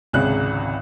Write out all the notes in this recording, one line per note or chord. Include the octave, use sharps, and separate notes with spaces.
G#1 C#2 C3 G#4 C#5 F#6